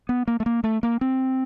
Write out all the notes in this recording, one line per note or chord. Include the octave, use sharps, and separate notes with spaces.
B3
A#3
A3
A#3
A3
A#3
C4